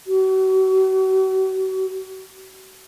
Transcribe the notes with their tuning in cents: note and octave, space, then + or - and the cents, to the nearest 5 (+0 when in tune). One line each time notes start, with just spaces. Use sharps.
F#4 +40